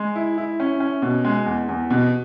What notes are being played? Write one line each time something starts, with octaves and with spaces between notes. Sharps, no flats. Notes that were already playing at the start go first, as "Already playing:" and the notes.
Already playing: G#3
E4
E4
C#4
C#4
B2
G#3
E2
E2
B2